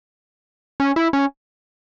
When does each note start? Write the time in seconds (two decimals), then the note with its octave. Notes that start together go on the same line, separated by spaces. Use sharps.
0.80 C#4
0.96 E4
1.13 C#4